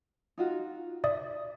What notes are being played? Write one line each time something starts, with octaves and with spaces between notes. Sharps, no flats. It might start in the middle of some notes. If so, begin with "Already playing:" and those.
D#4 F4 F#4
D5 E5 D#6